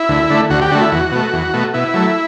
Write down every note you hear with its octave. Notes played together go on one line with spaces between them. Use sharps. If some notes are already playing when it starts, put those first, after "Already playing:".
Already playing: E4
D2
D3 A3
D2 F#4
G4
D3 A3 F#4
E4
E2 F#4
B2 A3
E2
B2 A3
B2 E4
F#3 A3